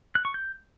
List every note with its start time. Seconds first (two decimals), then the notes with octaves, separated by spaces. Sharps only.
0.15 F#6
0.25 C#6
0.34 G6